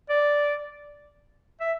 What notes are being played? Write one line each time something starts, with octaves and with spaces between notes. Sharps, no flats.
D5
E5